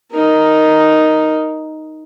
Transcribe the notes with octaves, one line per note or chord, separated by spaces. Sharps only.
D#4 A#4